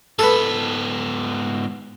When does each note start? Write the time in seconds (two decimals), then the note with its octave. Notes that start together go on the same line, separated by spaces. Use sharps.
0.19 G#2 B3 A4 B4